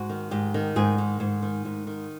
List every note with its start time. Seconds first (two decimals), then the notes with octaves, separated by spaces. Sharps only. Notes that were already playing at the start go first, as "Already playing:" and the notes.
Already playing: G#2 F#4
0.10 D#3
0.31 G#2 G4
0.54 D#3
0.76 G#2 G#4
0.98 D#3
1.20 G#2
1.42 D#3
1.65 G#2
1.87 D#3